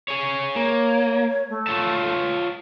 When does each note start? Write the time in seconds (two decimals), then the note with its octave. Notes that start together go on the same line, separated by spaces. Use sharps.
0.08 G#4 C#5
0.56 A#3 C#5
1.49 A3
1.67 F4 C#5 A5